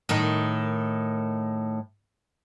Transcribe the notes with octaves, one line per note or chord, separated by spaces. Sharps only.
A2 D#3 D#4